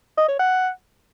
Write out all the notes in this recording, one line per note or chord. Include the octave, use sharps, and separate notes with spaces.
D#5
C#5
F#5